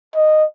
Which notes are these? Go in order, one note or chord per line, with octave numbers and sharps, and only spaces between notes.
D#5